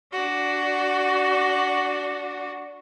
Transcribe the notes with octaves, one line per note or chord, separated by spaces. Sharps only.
D4 F#4